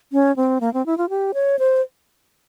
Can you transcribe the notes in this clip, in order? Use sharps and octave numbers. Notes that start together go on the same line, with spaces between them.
C#4
C4
A#3
C4
E4
F4
G4
C#5
C5